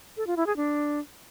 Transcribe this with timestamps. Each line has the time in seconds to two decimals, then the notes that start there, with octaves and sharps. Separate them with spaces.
0.17 A4
0.27 F4
0.37 E4
0.47 G#4
0.56 D4